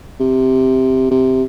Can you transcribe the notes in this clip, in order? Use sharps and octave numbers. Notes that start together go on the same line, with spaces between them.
C3
C3